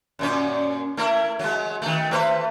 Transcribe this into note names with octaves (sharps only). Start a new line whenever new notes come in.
F#2 A#2 C#4
A3 E4 A#4
F#3 G#3
D#3 A3
A3 B4 C5